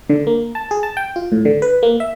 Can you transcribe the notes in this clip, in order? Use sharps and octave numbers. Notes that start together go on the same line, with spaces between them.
D3
A#3
A5
G#4
A5
G5
F4
A2
D3
B4
A#3
E5